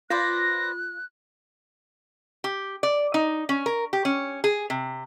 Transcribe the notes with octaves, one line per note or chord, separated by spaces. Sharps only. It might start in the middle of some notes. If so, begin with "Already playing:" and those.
F4 B4 C5 D5 F#6 A#6
G4
D5
D#4
C#4
A#4
G4
C#4
G#4
C3